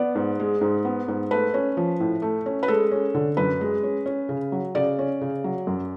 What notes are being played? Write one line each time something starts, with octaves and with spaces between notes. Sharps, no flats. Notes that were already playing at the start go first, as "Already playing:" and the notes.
Already playing: B3 D5
G#2
G#3
G#2
B3
G#2
A3 B4
C#4
F3
A2
A3
C#4
B4
G#3 A4
C#4
D3
F#2 B4
G#3
C#4
C#4
C#3
F#3
C#3 D5
C#4
C#3
F#3
F#2